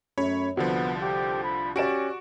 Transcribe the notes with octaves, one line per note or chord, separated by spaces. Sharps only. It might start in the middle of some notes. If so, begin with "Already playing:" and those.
F#2 A3 C#5 B5
C2 D3 F3 B3 F#4
G4
B5
C#4 F#4 G4 D5 D7 E7